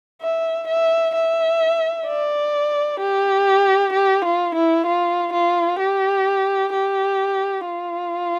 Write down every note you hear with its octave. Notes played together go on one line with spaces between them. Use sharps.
E5
E5
E5
D5
G4
G4
F4
E4
F4
F4
G4
G4
F4